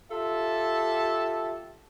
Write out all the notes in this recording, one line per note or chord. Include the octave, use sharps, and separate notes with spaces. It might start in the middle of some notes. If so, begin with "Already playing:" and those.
F4 G4 A4 E5 A5